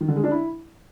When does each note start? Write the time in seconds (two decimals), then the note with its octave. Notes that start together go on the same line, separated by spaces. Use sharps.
0.01 D#3
0.08 D3
0.16 G#3
0.24 D4
0.31 E4